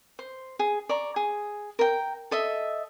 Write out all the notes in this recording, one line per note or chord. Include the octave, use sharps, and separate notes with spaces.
C5
G#4
D5 A#5 C#6
G#4
A#4 G5
A4 D#5 E5